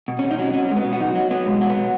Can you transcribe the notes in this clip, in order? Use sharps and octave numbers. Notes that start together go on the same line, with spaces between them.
B2
B2 C#4
D#4
F#3 C#4
F#3 C#4
F#3 G#3
B3
B2
F#4
F#3 D#4
F#3
F#3 B3
B2 G#3
F#3
B3
B2